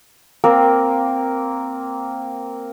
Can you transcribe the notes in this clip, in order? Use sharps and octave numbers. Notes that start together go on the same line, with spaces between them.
A#3 C4 A#4